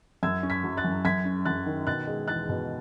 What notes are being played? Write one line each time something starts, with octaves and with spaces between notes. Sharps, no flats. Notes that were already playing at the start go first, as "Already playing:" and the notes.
F#2 E6 G#6
C#4
G#6 B6
F#3
F#6 A6
F#2
F#2 G#6 B6
C#4
F#2 F#6 A6
D#3
B2 F#6 A6
G#3
E2 F#6 A6
B2